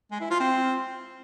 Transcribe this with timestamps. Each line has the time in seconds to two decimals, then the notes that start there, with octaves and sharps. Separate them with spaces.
0.11 G#3
0.21 E4
0.30 F4
0.40 C4